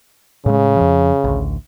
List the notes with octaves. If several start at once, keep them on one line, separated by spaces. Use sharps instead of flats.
A2 C#3 G#3
F2 F3
A1 D2